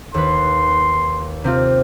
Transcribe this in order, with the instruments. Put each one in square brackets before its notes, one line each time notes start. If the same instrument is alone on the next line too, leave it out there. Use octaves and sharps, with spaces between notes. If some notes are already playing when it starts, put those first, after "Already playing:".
[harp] D#2 B4 [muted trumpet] C6
[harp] C3 C4 F4